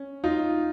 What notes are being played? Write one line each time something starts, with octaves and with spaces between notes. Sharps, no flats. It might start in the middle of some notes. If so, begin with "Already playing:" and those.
Already playing: C#4
D#4 F4